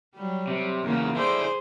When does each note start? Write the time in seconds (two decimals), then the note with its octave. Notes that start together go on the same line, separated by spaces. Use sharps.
0.15 F#3 G3
0.47 C3
0.84 E2 C#3 A#3
1.15 E4 G#4 A4 C5 D5